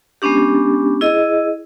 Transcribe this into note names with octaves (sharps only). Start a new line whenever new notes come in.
G#3 B3 C#4 D4 G4
E4 G#4 D#5